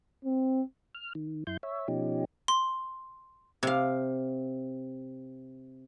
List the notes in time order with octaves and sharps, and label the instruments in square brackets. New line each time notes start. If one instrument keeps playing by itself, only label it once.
[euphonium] C4
[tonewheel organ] F6
D#3
F#2 E4 C6 G6
C#5 E5
B2 F3 C#4 D#4 G4
[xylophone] C6
[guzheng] C3 F5